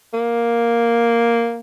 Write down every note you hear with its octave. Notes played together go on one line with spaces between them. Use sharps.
A#3